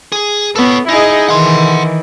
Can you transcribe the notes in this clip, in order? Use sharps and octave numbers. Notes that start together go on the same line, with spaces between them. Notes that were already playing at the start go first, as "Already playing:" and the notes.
G#4
B3 A4 C#5
D#4 E4 G#4 D#5
D#3 E3 F#5 C6